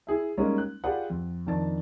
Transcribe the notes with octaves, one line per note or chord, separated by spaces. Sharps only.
E4 G#4 E5
G3 G#3 A#3 C#4 D#4
F#6
F4 G4 G#4 B4 D5 F#5
F2
F2 D#3 D4 A5 A6